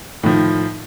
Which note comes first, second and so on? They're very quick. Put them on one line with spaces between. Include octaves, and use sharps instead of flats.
A2 F3 D#3